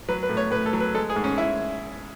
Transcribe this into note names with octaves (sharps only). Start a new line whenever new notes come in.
F#3 B4
B4
A2
C#5
A2 B4
A4
F#3
B4
G#3 A4
G#4
G#2
C#4
E4